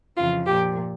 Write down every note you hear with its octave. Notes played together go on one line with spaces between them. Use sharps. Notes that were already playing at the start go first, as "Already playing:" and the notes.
F2 C#3 E3 F4
A#2 F3 G4